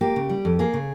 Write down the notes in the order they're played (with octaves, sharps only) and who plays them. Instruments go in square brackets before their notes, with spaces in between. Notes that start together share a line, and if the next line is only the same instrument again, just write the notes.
[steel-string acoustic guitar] A#3 G4
C#3
G3
F2
A#3 G#4
C#3